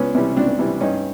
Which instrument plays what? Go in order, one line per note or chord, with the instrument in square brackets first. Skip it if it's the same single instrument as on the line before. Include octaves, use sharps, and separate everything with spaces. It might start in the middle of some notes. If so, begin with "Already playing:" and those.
Already playing: [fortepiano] C#2 B3 C#4
C3 E3 G3
C#2 C4 D4
C3 E3 G3
G2 C#4 D#4